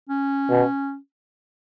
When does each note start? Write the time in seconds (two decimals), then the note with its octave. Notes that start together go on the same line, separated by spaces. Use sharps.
0.09 C#4
0.50 B2